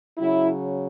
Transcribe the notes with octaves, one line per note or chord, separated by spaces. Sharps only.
C#3 F#3 E4